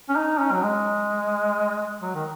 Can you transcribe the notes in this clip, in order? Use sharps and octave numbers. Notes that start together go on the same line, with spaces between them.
C#4
D#4
C#4
F#3
G#3
F#3
D#3